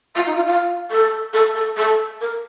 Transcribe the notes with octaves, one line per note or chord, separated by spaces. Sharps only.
F4
D#4
F4
F4
A4
A4
A4
A4
A#4